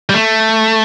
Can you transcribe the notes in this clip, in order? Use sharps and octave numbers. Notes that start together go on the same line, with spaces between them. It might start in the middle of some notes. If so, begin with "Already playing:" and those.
G3
A3